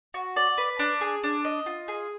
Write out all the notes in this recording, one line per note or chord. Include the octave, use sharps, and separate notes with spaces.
F#4
D5
B4
D4
G#4
D4
D#5
F4
G#4